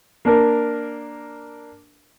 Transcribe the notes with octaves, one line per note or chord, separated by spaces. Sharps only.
A#3 D4 A#4